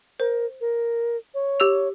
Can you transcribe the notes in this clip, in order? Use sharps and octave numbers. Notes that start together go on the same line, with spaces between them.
A#4 C5
A#4
C#5
G4 E6 F7